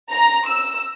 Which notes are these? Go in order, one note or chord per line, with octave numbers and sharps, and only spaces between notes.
A#5
E6